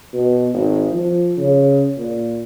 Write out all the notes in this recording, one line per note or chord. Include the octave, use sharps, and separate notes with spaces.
B2
G#1
F3
C#3
A#2